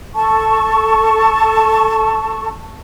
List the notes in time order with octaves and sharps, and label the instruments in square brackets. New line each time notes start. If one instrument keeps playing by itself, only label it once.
[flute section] A4 A5 C#6